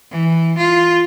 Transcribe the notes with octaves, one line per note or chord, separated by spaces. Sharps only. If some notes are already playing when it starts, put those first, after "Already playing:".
E3
F4